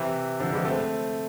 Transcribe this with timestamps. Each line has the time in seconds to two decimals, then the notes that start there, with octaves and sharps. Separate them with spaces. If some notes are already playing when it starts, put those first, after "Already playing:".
Already playing: C3 E3
0.40 D3 F3
0.53 E3 G#3
0.65 A3 C4